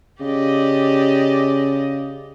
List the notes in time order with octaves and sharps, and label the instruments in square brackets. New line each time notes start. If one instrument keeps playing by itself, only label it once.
[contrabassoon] C#3 [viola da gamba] G4 D5 D#5